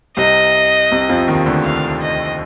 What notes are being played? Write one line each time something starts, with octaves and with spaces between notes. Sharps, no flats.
C2 C3 D#5
C2 C3
F2 F3
D#2 D#3
D2 D3
F5
D#5